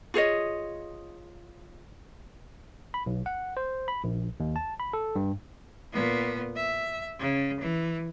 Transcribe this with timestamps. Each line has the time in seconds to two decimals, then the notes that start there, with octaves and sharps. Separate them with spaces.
0.14 F4 G#4 C#5 D#5
2.94 B5
3.06 B1
3.26 F#5
3.57 C5
3.88 B5
4.04 A#1
4.40 D#2
4.56 A5
4.80 B5
4.93 A4
5.15 G2
5.93 A#2 B3
6.56 E5
7.19 C#3
7.60 E3